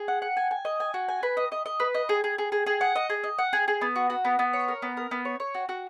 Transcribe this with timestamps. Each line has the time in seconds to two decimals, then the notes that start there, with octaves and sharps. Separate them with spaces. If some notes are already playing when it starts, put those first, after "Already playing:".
Already playing: G#4
0.08 F#5
0.22 F#5
0.37 G#5
0.51 G#5
0.65 D#5
0.80 G#5
0.94 F#4
1.09 G#5
1.23 B4
1.37 D#5
1.52 D#5
1.66 D#5
1.80 B4
1.94 D#5
2.09 G#4
2.24 G#4
2.38 G#4
2.52 G#4
2.66 G#4
2.81 F#5
2.95 D#5
3.10 G#4
3.24 D#5
3.39 F#5
3.53 G#4
3.68 G#4
3.81 B3
3.96 F#4
4.10 F#4
4.25 B3
4.39 B3
4.53 C#5
4.68 A#4
4.82 B3
4.97 A#4
5.11 B3
5.25 C#5
5.40 C#5
5.55 F#4
5.69 F#4